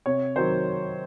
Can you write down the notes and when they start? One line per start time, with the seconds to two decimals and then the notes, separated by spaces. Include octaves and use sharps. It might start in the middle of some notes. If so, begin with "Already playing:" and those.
0.06 C3 C#5
0.36 D#3 F#3 C5